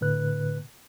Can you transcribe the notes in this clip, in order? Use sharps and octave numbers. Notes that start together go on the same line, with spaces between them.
A2 D3 B4 F#6